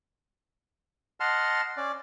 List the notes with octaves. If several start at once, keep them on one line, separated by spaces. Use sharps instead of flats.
D#5 F#5 A5 C6 F6
C#4 D5